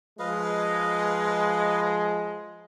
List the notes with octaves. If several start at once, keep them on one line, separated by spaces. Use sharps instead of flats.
F3 G#3 B4 D#5 F5